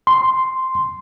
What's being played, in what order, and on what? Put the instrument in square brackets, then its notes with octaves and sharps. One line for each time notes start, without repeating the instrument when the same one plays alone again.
[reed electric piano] C6